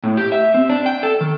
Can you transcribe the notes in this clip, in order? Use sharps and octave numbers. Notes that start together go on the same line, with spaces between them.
A2
G4
E5
C4
D4
G5
A4
D#3